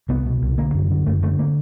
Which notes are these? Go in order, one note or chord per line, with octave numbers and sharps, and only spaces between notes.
C2 B3
B2
C2
D3 A#3
F#2
D3
F#2 A3
D3 A3
A#3